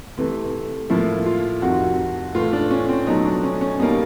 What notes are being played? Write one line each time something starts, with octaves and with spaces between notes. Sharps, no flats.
C3 E3 A3
A2 F3 A#3 E4
F4
F2 C3 D#3 F#4
A2 E3 A3 F4
D4
C#4
C4
B2 F#3 A3 D#4
D4
C#4
C#4
B2 G3 A#3 D#4